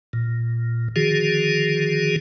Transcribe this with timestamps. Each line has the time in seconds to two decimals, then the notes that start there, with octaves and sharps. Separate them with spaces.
0.13 A#2
0.96 D3 D#3 F3 F#4 G#4